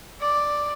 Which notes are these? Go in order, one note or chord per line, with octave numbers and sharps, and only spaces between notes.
D5